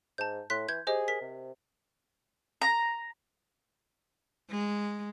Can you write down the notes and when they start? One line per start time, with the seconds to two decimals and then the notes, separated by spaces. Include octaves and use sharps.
0.18 G#2 A5 G6
0.50 A2 C6 F#6 B6
0.68 E3 G6 G#6
0.87 G4 G#4 C5 D#5
1.08 A#4 B6
1.21 C3
2.62 A#5
4.50 G#3